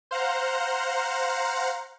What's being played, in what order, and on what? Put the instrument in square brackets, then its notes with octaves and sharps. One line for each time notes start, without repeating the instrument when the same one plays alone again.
[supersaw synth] C5 F5 F#5 A#5